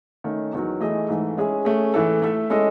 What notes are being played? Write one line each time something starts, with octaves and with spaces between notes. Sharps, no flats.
D#3 A3 C#4
E2 D#3 F#3
E3 A3 E4 G#4 D#5
G#2 E3 A3
G#3 C#4 E4 G#4
A3 C#4 G#4
A2 E3 A3 E4 A4
A3 E4 A4 E5
G#3 C#4 E4 A4 D#5